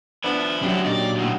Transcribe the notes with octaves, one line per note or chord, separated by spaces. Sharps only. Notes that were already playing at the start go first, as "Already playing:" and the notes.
F3 B3 D4 E4
C3 F#3 C#4 D4 F#4 G4
A#2 D4 D#4 G4 D5
D2 A2